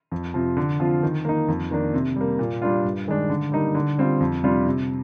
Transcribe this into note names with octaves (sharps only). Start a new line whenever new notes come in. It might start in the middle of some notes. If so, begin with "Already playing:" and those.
F2
C3 F3
D3
F3 C4 F4
D#3
A#3 D#4
F2
D#3 A#3 D4
C3
G3 A#3
A#2
G3 D4 F4
G2
D#3 G#3 D4
D3
G3 A#3 D#4
D3
G3 C4 F4
F2
C3 G3 D4 F4
C3